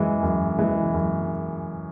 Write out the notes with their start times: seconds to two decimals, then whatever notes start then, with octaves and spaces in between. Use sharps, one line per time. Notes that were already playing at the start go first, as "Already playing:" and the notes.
Already playing: F#2 E3 G#3
0.23 F#2
0.59 E3 G#3
0.94 F#2